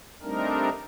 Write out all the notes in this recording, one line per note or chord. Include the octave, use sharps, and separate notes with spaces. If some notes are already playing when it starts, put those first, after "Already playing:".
G3 A3 C4 D4 D#4 A#4